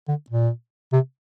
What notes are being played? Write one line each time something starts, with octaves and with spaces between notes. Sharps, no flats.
D3
A#2
C3